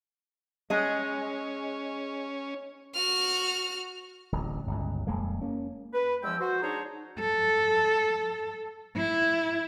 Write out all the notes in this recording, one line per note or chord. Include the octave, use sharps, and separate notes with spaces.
G#3 C#4 G#4 D#5
F#4 F6
D1 A1
G1 C#2
D#1 F2 G#3 A#3
A#3 C#4
B4
E2 F3 G#3 C#4 G5 E6
F#4 C5
D4 D#4 G#4 C5 C#5 A#5
A4
E4